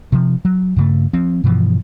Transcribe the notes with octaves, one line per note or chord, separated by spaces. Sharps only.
C3 F3
F#3
G2 C#3 A3
F3 C4
G2 B2 E3 F3